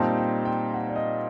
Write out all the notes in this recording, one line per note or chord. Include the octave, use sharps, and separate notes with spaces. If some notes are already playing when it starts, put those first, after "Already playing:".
Already playing: A#2 G3 C4 D#4 A5
G5
G5
F#5
D5
D#5